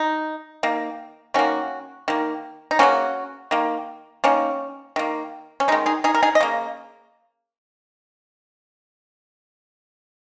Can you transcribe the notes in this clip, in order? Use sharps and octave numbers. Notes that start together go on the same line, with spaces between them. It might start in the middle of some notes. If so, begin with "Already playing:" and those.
Already playing: D#4
D#3 A#3
D#3 A#3 C#4 F#4
D#3 A#3
D#4
C#3 F#3 A#3 C#4 F#4
D#3 A#3
D#3 A#3 C#4
D#3 A#3
C#4
D#3 G#3 D#4
D#4 G#4
D#4 G#4
A#4
D#4 G#4
D#5
C#3 A#3